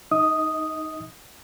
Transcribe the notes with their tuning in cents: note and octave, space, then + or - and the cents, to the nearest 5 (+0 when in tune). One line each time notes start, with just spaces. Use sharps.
D#4 +0 D#5 +35 D#6 +0